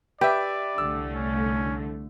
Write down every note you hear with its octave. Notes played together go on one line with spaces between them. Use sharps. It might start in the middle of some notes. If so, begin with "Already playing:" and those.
G4 B4 D5 E5
C2 D3 A3 E6
C#4